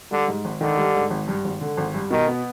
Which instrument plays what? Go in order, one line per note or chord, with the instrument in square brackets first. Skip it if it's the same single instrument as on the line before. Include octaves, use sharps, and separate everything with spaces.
[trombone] D3 [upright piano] G3
[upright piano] G#2
G#1
[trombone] D3 [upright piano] D#3
[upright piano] G3
G#2
G#1
G2
G#1
D3
G#1
G2
[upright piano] B2 [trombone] D#3
[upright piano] B3